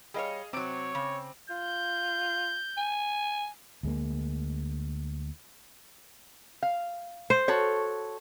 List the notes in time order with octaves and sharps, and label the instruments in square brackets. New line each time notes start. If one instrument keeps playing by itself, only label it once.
[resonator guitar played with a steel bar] G3 A#4 C#5 [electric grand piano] G#4 D#5 F5
[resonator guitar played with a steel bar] C3 F#3 [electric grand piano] C4 D6 D7 [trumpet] C#5
[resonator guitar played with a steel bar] C#3
[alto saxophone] F4 [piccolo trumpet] G6
[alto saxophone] G#5
[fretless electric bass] D2 G#3 A#3
[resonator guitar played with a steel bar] F5
[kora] C5
[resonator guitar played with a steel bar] F#4 A4 C#5